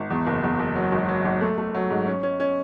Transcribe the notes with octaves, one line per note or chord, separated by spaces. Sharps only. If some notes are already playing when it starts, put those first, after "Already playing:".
Already playing: G#1
E2
F#1
E2
F#1
F#3
G#1
F#3
G#1
A3
A3
F#3
G#2
C#4
C#4
C#4